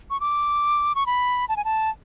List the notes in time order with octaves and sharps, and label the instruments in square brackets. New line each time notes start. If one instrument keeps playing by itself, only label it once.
[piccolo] C#6
D6
C#6
B5
A5
G#5
A5